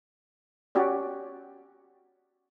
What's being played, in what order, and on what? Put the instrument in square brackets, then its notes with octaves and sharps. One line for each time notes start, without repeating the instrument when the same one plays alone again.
[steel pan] C#4 F#4 G4 D5